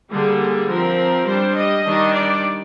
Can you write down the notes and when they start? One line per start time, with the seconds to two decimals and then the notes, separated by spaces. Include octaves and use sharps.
0.11 D3 G3 A#3 G#4
0.40 G#4
0.69 F3 C4 A#4
1.28 G3 D4 C5
1.57 D#5
1.86 D#3 G3 D4
2.15 D5